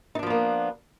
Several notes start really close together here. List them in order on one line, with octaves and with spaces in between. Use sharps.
D#4 D4 F3 B3 A#3